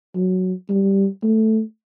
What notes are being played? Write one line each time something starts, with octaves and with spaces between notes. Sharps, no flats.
F#3
G3
A3